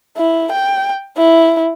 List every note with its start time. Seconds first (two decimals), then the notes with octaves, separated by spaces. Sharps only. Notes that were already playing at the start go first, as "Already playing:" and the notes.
0.17 E4
0.52 G5
1.17 E4